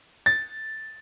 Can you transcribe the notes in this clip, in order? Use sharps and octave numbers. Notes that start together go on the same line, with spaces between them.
A6